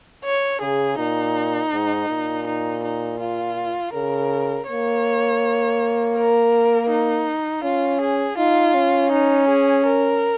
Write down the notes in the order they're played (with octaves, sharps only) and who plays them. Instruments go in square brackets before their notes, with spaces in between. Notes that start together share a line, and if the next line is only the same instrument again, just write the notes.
[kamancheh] C#5
[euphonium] C#3 [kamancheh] G#4
[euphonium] A#2 [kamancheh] D#4
[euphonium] G#2
A#2
[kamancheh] D#4
D#4
F4
[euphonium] C#3 [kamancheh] A#4
[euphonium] A#3 [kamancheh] C#5
[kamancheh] A#4
D#4
[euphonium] C#4 [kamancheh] F4
[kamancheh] G#4
[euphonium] D#4 [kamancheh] F4
[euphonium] C#4
[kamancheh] D#4
G#4
A#4